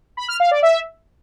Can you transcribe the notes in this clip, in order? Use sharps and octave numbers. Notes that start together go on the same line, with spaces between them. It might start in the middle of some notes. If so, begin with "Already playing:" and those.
B5
F6
F5
D5
E5